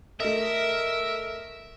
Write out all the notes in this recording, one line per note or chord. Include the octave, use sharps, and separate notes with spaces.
A3 A#4 D#5 E5